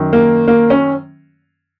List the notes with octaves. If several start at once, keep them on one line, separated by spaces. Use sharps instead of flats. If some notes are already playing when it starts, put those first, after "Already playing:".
Already playing: F#2 D#3
A#3
A#3
C#4